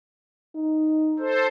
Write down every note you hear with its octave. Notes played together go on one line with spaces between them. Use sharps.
D#4
A4 C5